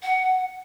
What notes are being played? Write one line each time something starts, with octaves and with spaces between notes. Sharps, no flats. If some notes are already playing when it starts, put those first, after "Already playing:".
F#5